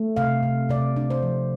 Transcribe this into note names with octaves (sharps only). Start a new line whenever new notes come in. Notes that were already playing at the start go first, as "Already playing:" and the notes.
Already playing: A3
C3 F5
C3
C3 D5
D4
C5
F3